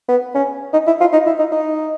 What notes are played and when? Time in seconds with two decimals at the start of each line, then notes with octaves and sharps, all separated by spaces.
0.08 B3
0.35 C#4
0.73 D#4
0.87 E4
1.01 F4
1.13 D#4
1.27 E4
1.39 D#4
1.52 D#4